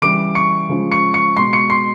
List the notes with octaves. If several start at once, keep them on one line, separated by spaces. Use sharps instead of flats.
C#3 E3 G3 D6 D7
C#6 C#7
C#3 F3 G#3
C#6 C#7
C#6 C#7
B2 G#3 C6 C7
C#6 C#7
C6 C7